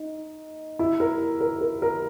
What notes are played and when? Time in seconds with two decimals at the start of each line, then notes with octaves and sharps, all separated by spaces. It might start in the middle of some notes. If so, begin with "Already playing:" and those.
Already playing: D#4
0.79 E4
1.00 A#4
1.41 A#4
1.61 A#4
1.82 A#4